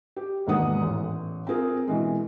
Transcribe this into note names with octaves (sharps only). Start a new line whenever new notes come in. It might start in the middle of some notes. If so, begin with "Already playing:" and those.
G4
E1 D#2 G#2 B3 F#5 D#6
A1
C4 F4 G#4 A#4
B2 E3 G#3